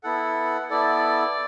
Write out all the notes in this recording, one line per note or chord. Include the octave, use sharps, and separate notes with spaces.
B3 E4 A4 F#5
B3 E4 A4 D5